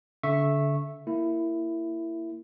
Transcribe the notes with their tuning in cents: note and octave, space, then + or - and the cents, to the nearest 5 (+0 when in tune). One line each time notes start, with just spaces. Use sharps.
D3 -30 E5 +0 C#6 -15
A#3 -10 E4 +10